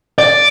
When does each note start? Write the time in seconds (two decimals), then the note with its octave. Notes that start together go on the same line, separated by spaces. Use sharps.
0.18 D5